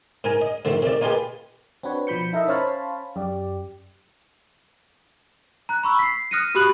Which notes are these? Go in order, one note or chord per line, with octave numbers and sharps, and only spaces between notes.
G#2 A#4 G#5 A#5
D#5
G#2 D3 D#3 F3 A3
C3 D#3 A3 D5
A#3 D#4 F4 G4 G#4 B4
C4 D4 F#4 B4 C#5
B2 F3 B5 G6 C#7
D#4 E4 A4 A#4 D#5 E5
C#4 C5 C#5 F5 A5 B5
F#2 G4 D5
A#5 F#6
B5 C#6 E6
B6 C7
D#6 F6 F#6 A#6 C#7 D#7
F#4 G4 B5 D#6 F#6 F#7